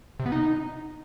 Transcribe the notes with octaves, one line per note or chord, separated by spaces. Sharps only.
C3
B3
D#4